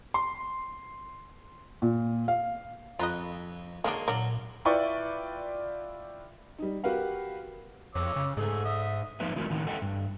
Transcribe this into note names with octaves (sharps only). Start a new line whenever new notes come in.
C6
A#2
F5
F2 F4 D#5 A#5 B5 F#6
D#3 F#3 G#3 A#3 D4 A#4
A#2 F#3 D4 A#4
E4 F4 B4 D5 G5 C#6
G3 D#4
F#4 G4 A#4 B4 F5 F#5
F2 C#5 D6 E6
C#3
G#2 A3 G#4
E5 D#6
F3 A#3 D#4 B4 E5
E3 A3 E4 F#4 A#4
A2 D#3 D#4 E4 F#5
A4 D#5 E5 F#5 G5
G2